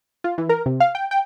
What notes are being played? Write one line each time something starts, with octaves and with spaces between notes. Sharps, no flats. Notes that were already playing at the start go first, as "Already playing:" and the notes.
F4
E3
A#4
C3
F5
G5
G5